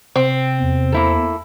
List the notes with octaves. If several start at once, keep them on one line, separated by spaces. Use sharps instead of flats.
C3 C4
E2
A#3 E4 A4